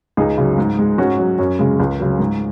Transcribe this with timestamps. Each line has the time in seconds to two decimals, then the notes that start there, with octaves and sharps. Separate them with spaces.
0.17 C#2 D#4 G#4
0.38 C#3 F#3
0.58 G#2
0.79 G#3
0.98 G#2 C#4 F#4
1.19 F#3
1.39 F#2 C#4
1.59 C#3 G#3
1.80 C#2
1.99 C#3 F#3
2.19 G#2